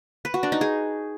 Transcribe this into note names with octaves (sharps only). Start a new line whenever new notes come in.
B4
F#4
D4
D#4
G#4